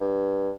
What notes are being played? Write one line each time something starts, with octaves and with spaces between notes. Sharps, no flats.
G2